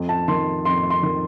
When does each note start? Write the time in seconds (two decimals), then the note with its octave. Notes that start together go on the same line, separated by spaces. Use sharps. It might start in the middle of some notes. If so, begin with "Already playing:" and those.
Already playing: F2
0.09 A5
0.28 D#3 C6
0.65 F2 C6
0.90 C6
1.03 D#3